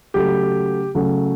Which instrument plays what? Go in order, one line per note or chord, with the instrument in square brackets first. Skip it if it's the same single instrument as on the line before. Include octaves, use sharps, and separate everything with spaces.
[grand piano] C#3 F#3 A3 G4
C#3 F#3 A3